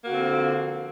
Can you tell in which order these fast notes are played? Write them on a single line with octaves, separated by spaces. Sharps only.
A#3 F#4 D3 C4 F3